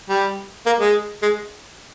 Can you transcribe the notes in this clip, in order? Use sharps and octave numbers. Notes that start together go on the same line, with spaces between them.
G3
A#3
G#3
G#3